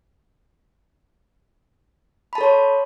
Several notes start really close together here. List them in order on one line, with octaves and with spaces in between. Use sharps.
B5 A5 A4 C#5 C6